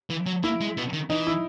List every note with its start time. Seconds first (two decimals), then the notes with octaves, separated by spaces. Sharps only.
0.10 E3
0.26 F#3
0.43 A#3 E4
0.61 G#3
0.77 B2
0.93 D#3
1.10 E3 D#4
1.27 E4